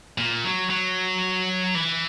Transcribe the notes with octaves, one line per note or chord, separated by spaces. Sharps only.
A#2
F#3
F#3
E3